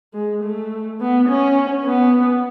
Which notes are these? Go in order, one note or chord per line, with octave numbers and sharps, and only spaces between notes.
G#3
A3
B3
C#4
B3